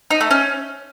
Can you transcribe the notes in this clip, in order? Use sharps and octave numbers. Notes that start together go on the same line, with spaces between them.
D#4
A3
C#4